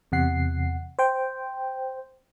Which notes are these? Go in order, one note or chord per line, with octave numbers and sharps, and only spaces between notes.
E2 C3 F#5 C7
C5 G5